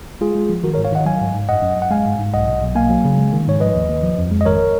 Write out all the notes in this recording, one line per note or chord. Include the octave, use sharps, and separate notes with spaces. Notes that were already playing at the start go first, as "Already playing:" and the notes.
G#3 F4 G#4
G#3
F3
D#3 F#4 A#4
A#4 C#5
G#2
C#5 F5
D#3 D#5 F#5
F#3 F5 G#5
G#2
G#2
F#2 D#5 F#5
F#2
F#2
F#5
G#3 F5 G#5
G#2
G#2
B1 D#5 F#5
B2
B1
A#3 F5 G#5
F#3
C#3
G#3
D#3
G#2 C#5
F3 B4 D#5
D#2
D#2
F3
F2
G#3
D#5
G#1 A#4 C#5